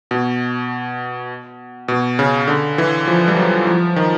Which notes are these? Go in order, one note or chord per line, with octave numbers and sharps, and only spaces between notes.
B2
B2
C#3
D3
E3
F3
G3
F#3
F3
D#3